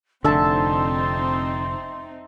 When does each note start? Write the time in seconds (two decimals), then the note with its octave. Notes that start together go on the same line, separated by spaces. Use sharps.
0.24 F1 D3 C4 D#4 E5 A5 C6